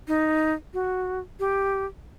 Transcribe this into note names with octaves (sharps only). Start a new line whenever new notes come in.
D#4
F#4
G4